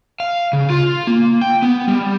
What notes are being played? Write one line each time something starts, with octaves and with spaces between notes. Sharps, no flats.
F5
C#3
F4
A#3
G5
B3
G3